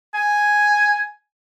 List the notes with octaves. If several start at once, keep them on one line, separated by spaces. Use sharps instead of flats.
G#5